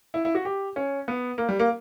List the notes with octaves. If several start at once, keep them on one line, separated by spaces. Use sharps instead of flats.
E4
E4
F#4
G4
C#4
B3
A#3
G3
A#3